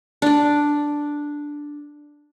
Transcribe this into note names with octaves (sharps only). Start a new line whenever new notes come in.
D4 D5